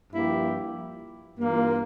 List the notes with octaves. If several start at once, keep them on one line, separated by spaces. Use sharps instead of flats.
G2 F3 A#3 E4 G4
G2 E3 A#3 F4